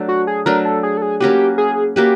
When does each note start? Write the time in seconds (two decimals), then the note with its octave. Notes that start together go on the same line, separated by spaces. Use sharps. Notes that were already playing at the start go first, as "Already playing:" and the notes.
Already playing: F#3 A3 D4
0.08 F#4
0.27 G#4
0.46 F#3 A3 D4 A#4
0.65 A4
0.83 G#4
0.97 A4
1.02 G#4
1.20 A#3 C#4 F#4 G4 B4
1.58 G#4
1.96 A#3 C#4 F#4 G4 B4